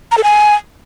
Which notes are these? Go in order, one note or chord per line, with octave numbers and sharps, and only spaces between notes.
A#5
A4
G#5